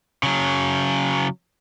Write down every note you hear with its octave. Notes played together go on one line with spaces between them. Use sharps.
C#3 F#3